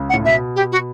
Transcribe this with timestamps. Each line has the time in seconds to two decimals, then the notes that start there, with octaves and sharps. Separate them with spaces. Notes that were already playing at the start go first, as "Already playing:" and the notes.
Already playing: C#2 C#3
0.09 F#5
0.14 A2
0.25 B2 E5
0.56 G4
0.72 F#4